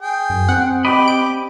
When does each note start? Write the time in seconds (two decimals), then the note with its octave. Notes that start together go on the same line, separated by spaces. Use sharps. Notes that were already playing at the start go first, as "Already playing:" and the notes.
0.02 G#4 G5
0.30 F#2
0.49 C4 F#5
0.85 G4 D5 D#5 B5
1.08 D7